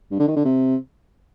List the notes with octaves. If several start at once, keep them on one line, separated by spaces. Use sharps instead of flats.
G2
D3
D#3
D3
C3